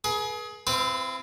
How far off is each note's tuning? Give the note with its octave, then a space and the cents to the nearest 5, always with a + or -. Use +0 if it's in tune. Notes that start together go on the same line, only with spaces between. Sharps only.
G#4 +25 B4 -45
C4 -10 E4 +40 B4 +20